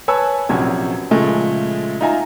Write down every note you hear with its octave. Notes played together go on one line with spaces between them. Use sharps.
B4 C#5 G#5 A5 E6
A#1 C3 F#3 C#4 G#6
A#2 C#3 F3 G#3 A3
D#4 F4 E5 G#5 A#5